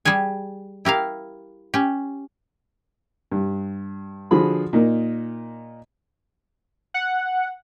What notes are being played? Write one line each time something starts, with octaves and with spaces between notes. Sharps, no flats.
G3 G4 G#4 G#5
E4 G4 A#4 F5
C#4 G4
G2
D3 F3 F#4 G#4 B5
A#2 D#4 A#4
F#5